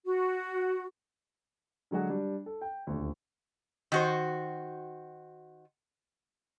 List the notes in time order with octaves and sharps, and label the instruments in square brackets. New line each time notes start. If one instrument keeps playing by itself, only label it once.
[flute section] F#4
[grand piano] D3 F#3 G#3 F#4 G#4
G3 D4
A4
G5
D#1 D2
[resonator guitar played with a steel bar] D#3 F#4 C5